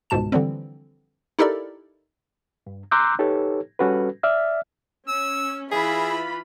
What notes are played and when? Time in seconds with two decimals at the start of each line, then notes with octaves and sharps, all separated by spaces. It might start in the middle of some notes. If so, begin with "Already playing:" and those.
0.10 G1 C#2 G#2 B2 A5 E7
0.32 D3 E3 F3 G3 C4
1.39 D#4 E4 G4 A4 A#4 D5
2.67 G2
2.91 A#5 C6 D6 E6 F#6 G6
3.19 D#4 G4 A4 B4 C#5
3.79 G3 C#4 F#4 A4 B4
4.23 D5 E5 F6
5.08 C#4 E6
5.72 E3 E4 F4 G#4 B5